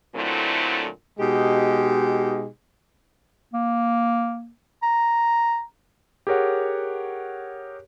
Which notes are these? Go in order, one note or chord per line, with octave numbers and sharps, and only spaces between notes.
A#2 D3 F#3 A3 C4 E4
B2 G#3 D#4 G4
A#3
A#5
G4 G#4 A#4 C#5 F#5